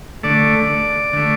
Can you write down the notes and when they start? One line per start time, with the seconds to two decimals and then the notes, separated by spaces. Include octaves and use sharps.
0.23 D3 A3 D5
1.13 D3 A3